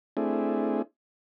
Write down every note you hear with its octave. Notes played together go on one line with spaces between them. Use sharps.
A3 C4 D4 E4 G#4